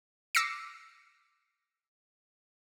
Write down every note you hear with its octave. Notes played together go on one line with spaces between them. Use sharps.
D6 E6 A#6 C7 C#7